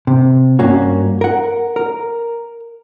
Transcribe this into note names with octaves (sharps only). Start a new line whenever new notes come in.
C3
G2 A#3 C#4 F#4
A#4 F#5
A#4